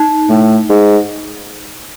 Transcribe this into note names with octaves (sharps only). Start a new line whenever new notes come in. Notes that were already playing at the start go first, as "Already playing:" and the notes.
Already playing: D#4
A2
G#2